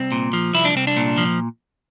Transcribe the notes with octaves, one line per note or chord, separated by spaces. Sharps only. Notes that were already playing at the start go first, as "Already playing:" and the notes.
Already playing: C2 C4
A#2
F3
C2 E4
D4
C2 C4
D4
A#2
F3